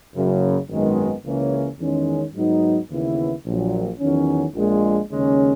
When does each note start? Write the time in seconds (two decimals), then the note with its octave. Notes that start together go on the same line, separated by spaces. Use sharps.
0.14 F#1 F#2 C#3
0.69 G#1 F#2 D#3 G#3 B3
1.24 C#2 C#3 E3 A#3 C#4
1.79 E2 D#3 G#3 C#4
2.34 G#2 F#3 B3 D#4
2.90 D#2 C#3 E3 B3 E4
3.45 A#1 A#2 F#3
4.00 E2 D#3 F#3 C#4
4.55 A#1 A#2 G#3
5.10 D#2 C#3 G#3 C#4